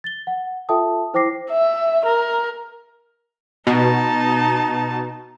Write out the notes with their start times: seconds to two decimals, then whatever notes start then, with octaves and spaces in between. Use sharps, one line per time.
0.04 A6 G7
0.27 F#5
0.69 F4 A4 E5 G5 A5 D#6
1.14 E4 C5 G5 D6 A#6 C7
1.51 E5
2.06 A#4
3.67 B2 D#4 A5